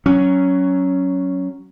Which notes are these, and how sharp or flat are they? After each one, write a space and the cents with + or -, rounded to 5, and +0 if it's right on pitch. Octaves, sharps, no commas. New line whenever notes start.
F#3 +10 C#4 +0